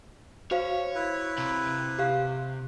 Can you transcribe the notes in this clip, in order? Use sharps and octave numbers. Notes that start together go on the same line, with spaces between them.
F#4 C5 C#5 F5
E4 B4
C3
G4 F5 F#6